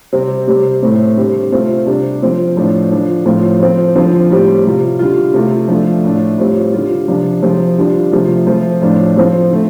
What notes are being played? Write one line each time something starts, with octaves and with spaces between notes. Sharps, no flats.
C3 G3 C4
C3 G3 C4
A2 A3 C4
D3 G3 C4
C3 A3 C4 F4
C3 G3 D4
F3 C4 F4
A2 F3 D4
D3 F3 D4 F4
A2 F3 C4 F4
F3 C4 F4
D3 F3 C4 F4
A2 G3 C4
C3 G3 F4
D3 G3 F4
C3 A3 F4
F3 A3 D4 F4
A2 A3 D4
A2 G3 C4 F4
D3 G3 F4
C3 F3 D4
C3 F3 C4
D3 G3 D4 F4
C3 F3 A3 F4
F3 A3 C4 F4
A2 F3 D4 F4
F3 C4 F4
D3 A3